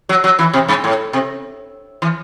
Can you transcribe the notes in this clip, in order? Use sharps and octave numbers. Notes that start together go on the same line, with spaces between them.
F#3
F#3
E3
C3
G2
A2
C3
E3